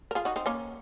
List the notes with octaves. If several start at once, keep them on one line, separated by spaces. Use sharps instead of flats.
A#4
F4 G#4
D#4 F#4
C4 D#4
A#3 C#4